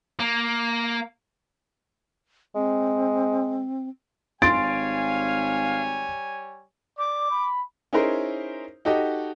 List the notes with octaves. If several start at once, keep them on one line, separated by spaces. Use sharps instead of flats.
A#3
G#3 C4
G#1 G3 C#5 F5 G#5 C6 A6 D7
D5 D6
B5
C#4 D#4 E4 G#4 A#4 C5
D#4 F#4 G4 A4 D#5